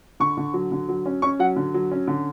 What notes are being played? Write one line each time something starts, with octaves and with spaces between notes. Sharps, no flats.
D3 C#6
D3
F#3
D3
F#3
C#4
C#4 C#6
F#3 F#5
D3
F#3
C#4
D3